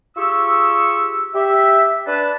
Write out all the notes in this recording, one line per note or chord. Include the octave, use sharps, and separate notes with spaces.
F4 G4 G#4 C#6 E6
G4 E5
D4 B4 A5